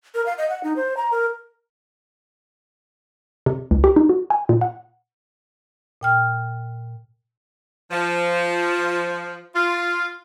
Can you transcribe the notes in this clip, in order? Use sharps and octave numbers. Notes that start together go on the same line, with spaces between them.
A#4
F5
D#5
F#5
D#4
C5
A#5
A#4
C3
C#2
G4
D#4
F#4
G#5
A#2
F#5
A#2 G5 F6
F3
F4